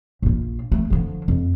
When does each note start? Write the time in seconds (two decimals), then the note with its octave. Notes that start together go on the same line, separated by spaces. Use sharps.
0.23 A#1 F4
0.72 A3
0.90 D3 F3
1.28 F2